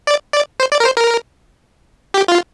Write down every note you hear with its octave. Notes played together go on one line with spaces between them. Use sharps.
D5
D5
C5
D5
A#4
C5
A#4
G4
F4